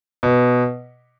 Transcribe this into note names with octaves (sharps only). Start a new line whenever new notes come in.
B2